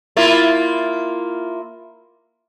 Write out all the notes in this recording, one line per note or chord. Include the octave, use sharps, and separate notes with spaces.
A#3 E4 F4